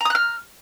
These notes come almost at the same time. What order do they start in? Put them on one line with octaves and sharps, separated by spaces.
A#5 D#6 F#6 F6